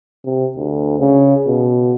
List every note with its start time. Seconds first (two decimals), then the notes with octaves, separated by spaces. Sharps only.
0.25 C3
0.57 D2
0.99 C#3
1.47 B2